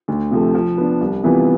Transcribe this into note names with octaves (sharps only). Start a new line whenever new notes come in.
D2
C3 F3 A3
F3
B3 D4
C2
C3 E3 B3 F4